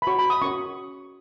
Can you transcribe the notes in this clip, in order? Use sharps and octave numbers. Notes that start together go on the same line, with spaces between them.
B5
F#4 C#5 C#6
B5
D#6
C#4 F#4 A#4 C#5 C#6